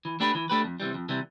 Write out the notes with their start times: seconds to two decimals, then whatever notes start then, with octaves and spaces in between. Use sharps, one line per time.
0.05 E3
0.20 A3 D4 G4 B4
0.35 E3
0.50 A3 D4 G4 B4
0.64 F2
0.80 C3 E3 G3
0.94 F2
1.09 C3 E3 G3